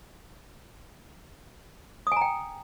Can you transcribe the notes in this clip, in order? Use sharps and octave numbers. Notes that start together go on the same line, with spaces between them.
G5 G#5 A#5 D#6